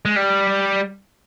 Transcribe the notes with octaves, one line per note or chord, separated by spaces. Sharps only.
G#3
G3